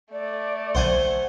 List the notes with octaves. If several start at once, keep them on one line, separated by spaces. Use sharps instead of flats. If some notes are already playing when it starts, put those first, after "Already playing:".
A3 D5
B1 C5 F#5 G#5 D#7